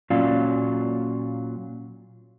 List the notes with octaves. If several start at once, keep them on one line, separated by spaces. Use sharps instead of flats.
A#2 F#3 C#4 F4 D5 F5